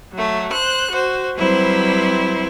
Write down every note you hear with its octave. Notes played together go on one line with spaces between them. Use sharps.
F#3 A3
C5 F#6
F#4 C5
F#3 G3 C4 E4 B4 C5